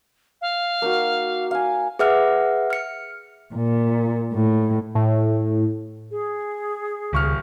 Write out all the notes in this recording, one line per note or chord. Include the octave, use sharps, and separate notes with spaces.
F5
A#3 D#4 F#4
F5 G#5
G#4 B4 E5 F#5 F6
F6 C#7
A#2
A2
A2
G#4
D#1 C#2 C#6 F6